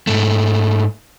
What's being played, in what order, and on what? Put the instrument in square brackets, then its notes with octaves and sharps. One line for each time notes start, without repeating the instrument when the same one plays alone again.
[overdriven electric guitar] G#2 A3